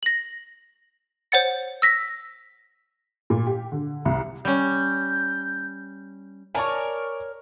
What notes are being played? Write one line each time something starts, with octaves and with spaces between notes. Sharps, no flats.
A#6 F#7
C5 C#5 F#5 A6 C#7
E6 A#6 B6
A#2
G4
D3
C2
G3 C#4 G6
A#4 C#5 D5 G#5 A5 C#6